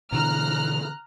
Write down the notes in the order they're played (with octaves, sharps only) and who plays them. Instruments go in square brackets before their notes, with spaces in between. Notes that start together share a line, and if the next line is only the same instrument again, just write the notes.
[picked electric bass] B2 D3 E3 [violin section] A#5 F6 F#6